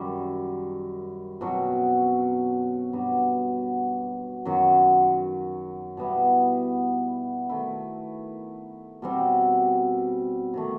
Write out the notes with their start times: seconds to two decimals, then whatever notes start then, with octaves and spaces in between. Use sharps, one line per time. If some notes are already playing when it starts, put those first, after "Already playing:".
Already playing: F#2 D#3 G3
1.41 B2 F#3 C4
2.93 G2 F#3 B3
4.45 F#2 D#3 F#3
5.97 B2 G3 B3 E4
7.49 D#3 A3 E4
9.02 B2 G3 C4
10.54 C3 D#3 A3